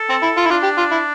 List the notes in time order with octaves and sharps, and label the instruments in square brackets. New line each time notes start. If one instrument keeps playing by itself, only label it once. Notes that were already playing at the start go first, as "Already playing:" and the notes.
Already playing: [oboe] A4
[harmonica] C4
E4
F4
E4
[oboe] D4 [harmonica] F4
[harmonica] G4
F4
E4